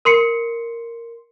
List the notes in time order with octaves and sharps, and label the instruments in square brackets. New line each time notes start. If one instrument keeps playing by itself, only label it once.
[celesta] A#4 C6 C7 C#7